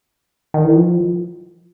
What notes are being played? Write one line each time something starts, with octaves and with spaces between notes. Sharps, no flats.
D#3
E3
F3